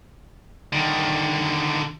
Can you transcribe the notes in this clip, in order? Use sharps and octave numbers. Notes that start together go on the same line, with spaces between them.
D3 D#3